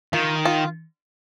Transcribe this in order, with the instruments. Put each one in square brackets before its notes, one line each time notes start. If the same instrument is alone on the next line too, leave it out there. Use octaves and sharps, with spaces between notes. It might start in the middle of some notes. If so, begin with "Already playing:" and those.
[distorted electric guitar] D#3 [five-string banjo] F4
[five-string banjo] F4